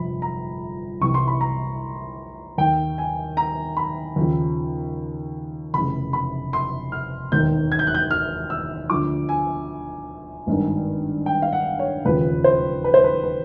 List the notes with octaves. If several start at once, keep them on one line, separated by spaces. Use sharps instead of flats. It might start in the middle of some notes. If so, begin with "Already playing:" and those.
Already playing: G1 F2 C3 F3 B5
A#5
C2 C3 E3 C#6
C6
B5
A#5
D#2 D#3 G5
G#5
A#5
B5
D#2 C#3 F3
F1 E2 C#3 B5
B5
C6
F6
E1 D#2 D#3 G6
G#6
G6
F#6
G6
F6
E6
D2 D3 F3 D6
G#5
G#1 G2 D#3
G5
F5
F#5
C#5
E1 D#2 C#3 F3 B4
C5
B4
C5
B4
B4